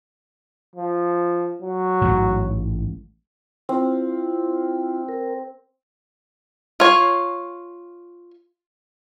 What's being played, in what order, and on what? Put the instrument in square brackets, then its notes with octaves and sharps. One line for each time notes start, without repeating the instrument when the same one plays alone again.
[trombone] F3
F#3
[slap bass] A1 G#2
[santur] C4 [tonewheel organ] E4 F4
[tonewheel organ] A#4
[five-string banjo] F4 C#5